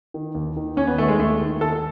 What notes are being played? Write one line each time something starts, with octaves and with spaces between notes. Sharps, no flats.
D#3
D#2
D#3
D#2 C#4
B3
D#3 A3
G#3
D#2 A3
D#3
D#2 A4